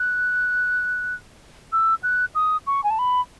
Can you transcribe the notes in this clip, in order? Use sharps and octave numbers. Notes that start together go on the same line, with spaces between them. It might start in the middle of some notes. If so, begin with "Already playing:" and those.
Already playing: F#6
E6
F#6
D#6
C#6
G#5
A5
B5